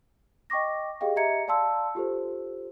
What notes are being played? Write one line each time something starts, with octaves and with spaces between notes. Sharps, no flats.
D#5 G5 C#6 D6 A#6
G4 G#4 D#5 F5 G5
G4 D#5 E5 A#5 G#6 C#7
D5 F5 A5 C6 E6
F4 G4 A4 C5